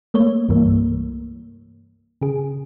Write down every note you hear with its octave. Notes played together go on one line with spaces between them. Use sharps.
A3 A#3 C#5
C2 G2 E3 A#3
C#3 G#4